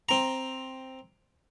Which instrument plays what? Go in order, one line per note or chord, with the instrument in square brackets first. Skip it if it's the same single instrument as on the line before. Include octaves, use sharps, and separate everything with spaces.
[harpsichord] C4 A#5